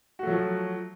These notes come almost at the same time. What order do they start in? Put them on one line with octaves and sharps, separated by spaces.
F#4 A3 F#3 F3